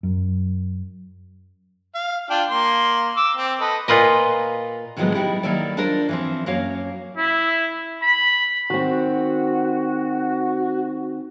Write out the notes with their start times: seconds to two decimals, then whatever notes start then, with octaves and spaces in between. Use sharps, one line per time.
0.03 F#2
1.95 F5
2.30 D4 F4 G5
2.50 A#3 C6
3.17 D6 E6
3.36 C4
3.60 A4 B4 D#5
3.88 A#2 F4 B4 D#5
4.97 A2 D#3 F3 F#3 G#3 B3
5.14 G3 D#4 E4 G4
5.43 D#3 F#3 A#3 E4 A4 D5
5.77 D4 F4 A4 A#4 C5 D5
6.09 E3 F3 C4
6.46 F#2 A#3 F#4 C#5 F5
7.17 E4
8.03 B5
8.70 D#3 C4 F#4